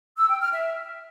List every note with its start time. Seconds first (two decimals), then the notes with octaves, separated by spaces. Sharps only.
0.18 E6
0.30 G5
0.41 F6
0.53 E5